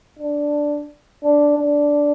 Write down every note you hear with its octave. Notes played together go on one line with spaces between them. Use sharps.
D4
D4
D4